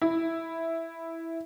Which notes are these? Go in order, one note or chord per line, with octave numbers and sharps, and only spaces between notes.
E4